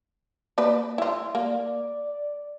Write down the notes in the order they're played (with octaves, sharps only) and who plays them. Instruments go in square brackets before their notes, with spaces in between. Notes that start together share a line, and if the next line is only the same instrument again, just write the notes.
[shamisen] A#3 B4 D5
E4 F4
[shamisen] A#3 [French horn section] D5